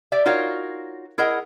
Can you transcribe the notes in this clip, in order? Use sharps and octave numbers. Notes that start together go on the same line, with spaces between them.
G4 D5 E5
D#4 F4 F#4 A#4 C#5 F5
E4 G#4 A#4 D#5 F#5